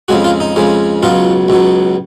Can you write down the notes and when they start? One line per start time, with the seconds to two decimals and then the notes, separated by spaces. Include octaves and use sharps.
0.08 F2 C#3 G#3 F#4
0.24 F4
0.40 D#4
0.56 F2 C#3 G#3
1.03 C#2 B2 F#3 F4
1.48 C#2 B2 F#3